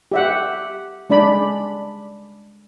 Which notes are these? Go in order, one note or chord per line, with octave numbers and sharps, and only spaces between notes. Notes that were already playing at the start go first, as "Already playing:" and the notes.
G4 E5 F#5
G#3 D4 D5 B5